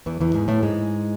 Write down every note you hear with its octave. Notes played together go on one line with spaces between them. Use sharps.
E2 E3
E2 E3
G#2 G#3
A2 A3
G#2 G#3